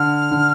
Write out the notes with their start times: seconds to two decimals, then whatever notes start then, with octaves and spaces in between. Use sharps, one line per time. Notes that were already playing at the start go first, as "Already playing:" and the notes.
Already playing: D3 F6
0.31 D3